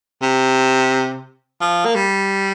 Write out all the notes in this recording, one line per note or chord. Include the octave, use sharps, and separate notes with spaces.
C3
F3
A#3
G3